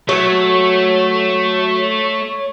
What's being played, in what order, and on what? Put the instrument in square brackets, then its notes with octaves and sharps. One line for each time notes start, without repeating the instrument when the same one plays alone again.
[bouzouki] F#3 [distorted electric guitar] A3 [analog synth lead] C#5